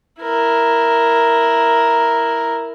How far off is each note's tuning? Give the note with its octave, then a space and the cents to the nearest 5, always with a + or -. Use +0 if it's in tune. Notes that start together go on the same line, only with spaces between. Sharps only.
E4 +0 A#4 +0